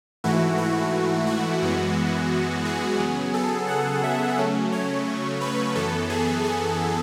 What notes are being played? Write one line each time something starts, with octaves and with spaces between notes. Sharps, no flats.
G#2 E3 A3 E4 F#4
F#4
F#4
F#2 E3 G#3 B3
G#4
C#3 F#3 B3
A4
F#5
E5
C#3 F#3 A3 C#4
C#5
B4
F#2 E3 B3 A4
G#4
G#4